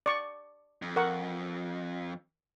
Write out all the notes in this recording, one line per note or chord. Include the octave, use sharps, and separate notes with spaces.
D5 C#6
F2
A#4 F#5 C#6